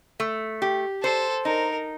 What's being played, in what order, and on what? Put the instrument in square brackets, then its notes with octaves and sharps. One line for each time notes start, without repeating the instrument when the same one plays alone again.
[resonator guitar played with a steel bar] A3
G4
[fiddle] A4 [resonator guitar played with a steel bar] C5
[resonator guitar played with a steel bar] D#4 [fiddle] A#4